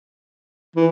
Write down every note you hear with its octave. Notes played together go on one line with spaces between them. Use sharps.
E3